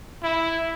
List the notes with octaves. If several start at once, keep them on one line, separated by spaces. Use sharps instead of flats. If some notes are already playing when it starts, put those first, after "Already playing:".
E4